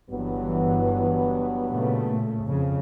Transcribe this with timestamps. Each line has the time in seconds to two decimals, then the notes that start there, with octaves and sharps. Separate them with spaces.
0.10 G1 G2 E3 F#3 B3
1.69 A#2 C#3 A3
2.43 F2 C#3